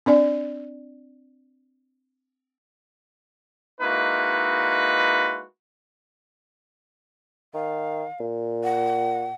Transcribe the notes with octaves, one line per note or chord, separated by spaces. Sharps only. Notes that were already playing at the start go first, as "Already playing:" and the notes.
C4 D4 D5
G#3 A#3 D#4 E4 F#4 B4
D#3 F5
A#2
F#5